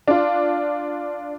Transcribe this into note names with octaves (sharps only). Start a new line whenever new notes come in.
D4 F4